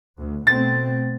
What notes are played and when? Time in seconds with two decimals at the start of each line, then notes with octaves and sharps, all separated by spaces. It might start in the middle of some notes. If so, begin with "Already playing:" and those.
0.18 D2
0.47 B2 A3 C4 A6